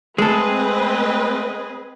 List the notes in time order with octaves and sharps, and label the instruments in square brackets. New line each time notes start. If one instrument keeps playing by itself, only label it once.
[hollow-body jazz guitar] G#3 A4 [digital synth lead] A3 [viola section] C4 B4 D#5 [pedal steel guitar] G#4